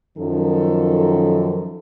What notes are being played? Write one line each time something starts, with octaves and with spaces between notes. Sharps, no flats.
F#2 D#3 F3 A4